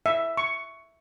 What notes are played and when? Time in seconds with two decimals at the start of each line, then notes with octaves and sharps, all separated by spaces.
0.06 E5
0.37 C#6